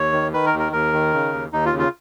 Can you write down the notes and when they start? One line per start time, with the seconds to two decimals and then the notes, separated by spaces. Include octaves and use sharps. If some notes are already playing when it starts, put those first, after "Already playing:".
Already playing: D#2 C#5
0.12 D#3
0.33 D#3 B4
0.46 A#4
0.53 D#2
0.59 A#4
0.72 D#2 A#4
0.93 D#3
1.13 C#3
1.33 D#2
1.52 D#2 D#4
1.66 F4
1.73 C#3
1.79 F4